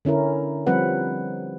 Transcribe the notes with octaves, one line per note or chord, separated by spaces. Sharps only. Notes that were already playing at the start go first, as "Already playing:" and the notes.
D3 C#4 E4 A#4
F3 G3 C4 B4 F#5